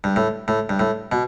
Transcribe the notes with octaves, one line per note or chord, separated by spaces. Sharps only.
G2
A2
A2
G2
A2
B2